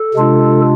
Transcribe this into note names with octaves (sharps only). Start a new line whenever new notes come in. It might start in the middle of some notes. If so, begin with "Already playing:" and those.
Already playing: A4
C3 G#3 D4 F4